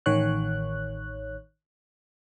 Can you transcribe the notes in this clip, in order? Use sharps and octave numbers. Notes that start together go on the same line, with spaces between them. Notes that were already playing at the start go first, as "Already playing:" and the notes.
A1 D#3 C#5 F#6